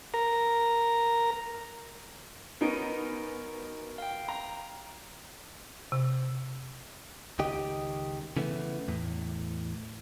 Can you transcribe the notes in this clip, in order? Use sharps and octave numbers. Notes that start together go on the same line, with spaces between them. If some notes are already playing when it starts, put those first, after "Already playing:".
A#4 A#5
B3 C#4 D#4 F#4 A#4 D7
F5 G5
A#5
C3
C#2 D#3 G4 D#5
C#3 E3 A3 B3
E2 A2